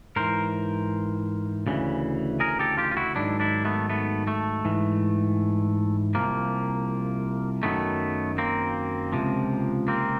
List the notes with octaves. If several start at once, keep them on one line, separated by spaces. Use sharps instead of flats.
G#2 E3 A#4 C5
D2 C#3 E3
G#4 A#4
G4 A4
F4 G4
F4
E4 F#4
G#2 D#3 F#3 D4 E4
D4 E4
A3 B3
A3 B3
A3
G#2 E3
C2 C3 F3 A#3
F#2 D#3 F#3 A3 B3
A#3 C4
C#2 C3 F3
A#3 C4